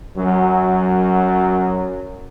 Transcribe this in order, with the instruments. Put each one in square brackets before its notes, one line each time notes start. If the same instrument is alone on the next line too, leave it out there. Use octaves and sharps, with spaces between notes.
[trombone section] F#2 F#3